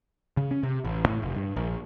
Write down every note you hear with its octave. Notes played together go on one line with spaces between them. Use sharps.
C#3
C#4
C3
A1
A2
F1
G2
A#1